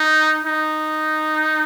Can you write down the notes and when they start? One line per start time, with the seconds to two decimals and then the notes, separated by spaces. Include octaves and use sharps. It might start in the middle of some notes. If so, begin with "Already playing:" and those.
Already playing: D#4
0.45 D#4